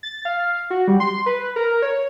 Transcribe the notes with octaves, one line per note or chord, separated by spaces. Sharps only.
A6
F5
F#4
G3
C6
B4
A#4
C#5